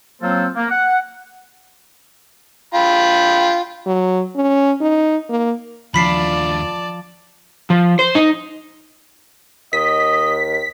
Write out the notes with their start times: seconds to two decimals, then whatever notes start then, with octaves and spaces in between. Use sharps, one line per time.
0.22 F#3 A#3 C4 F4 A4 C5
0.55 A#3
0.71 F#5
2.74 F4 G5 B5
3.87 F#3
4.36 C#4
4.81 D#4
5.29 A#3
5.94 D#2 F3 D4 D5 A5 B5 B6 C7
7.70 F3
7.99 C5
8.15 D#4
9.73 D#2 D#5 B6